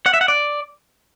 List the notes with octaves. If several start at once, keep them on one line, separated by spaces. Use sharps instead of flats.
F#5
E5
F#5
D5